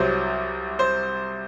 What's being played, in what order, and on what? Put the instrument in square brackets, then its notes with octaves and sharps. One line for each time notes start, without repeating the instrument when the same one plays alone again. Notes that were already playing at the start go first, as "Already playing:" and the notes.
Already playing: [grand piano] C2 C3 F#3 C5
C5